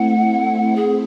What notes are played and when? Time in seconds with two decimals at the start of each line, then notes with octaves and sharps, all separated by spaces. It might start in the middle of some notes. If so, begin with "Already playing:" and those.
Already playing: A3 C4 E4 F#5
0.76 G#4